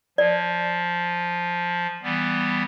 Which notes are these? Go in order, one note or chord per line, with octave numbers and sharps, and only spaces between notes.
F3 D5
E3 G3 B3